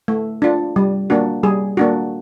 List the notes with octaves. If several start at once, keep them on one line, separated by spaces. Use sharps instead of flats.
A3
D4 F4
G3
A#3 D4 F#4
G3 G#4
A#3 D4 F#4